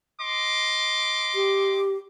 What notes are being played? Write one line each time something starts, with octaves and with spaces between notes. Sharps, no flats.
D#5 C6 D6
G4